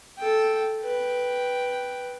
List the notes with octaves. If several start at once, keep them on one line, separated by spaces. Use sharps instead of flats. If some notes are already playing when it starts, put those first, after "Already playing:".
A4 G5
B4 G5